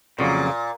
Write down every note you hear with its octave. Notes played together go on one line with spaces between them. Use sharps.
F2 A#2 C#3 F#3 A#3